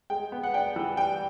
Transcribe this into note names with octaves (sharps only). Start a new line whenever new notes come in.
G#3 G5
B3
F#5
D4 G5
E3
G3 G5